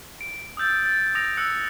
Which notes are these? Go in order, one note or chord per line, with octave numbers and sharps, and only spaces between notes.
D7
D#6 E6 G6 A6
A6
D#6 E6 A#6 D7 F7
E6 F#6 C#7